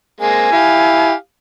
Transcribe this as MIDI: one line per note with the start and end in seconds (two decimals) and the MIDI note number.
0.21 0.49 56
0.21 0.49 58
0.21 0.49 60
0.21 1.13 80
0.52 1.15 64
0.52 1.14 67
0.52 1.14 77